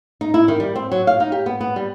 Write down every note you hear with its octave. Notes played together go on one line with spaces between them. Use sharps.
D#4
E4
D#3
G3
C4
F#3
F5
D#4
G4
B3
B3
G3